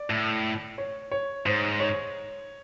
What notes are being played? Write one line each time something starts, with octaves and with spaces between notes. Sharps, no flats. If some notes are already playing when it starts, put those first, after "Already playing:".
Already playing: D5
A2
C#5
C#5
G#2 C5
C#5